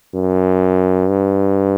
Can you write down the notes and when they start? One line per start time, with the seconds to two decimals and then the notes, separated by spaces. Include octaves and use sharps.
0.15 F#2
1.09 G2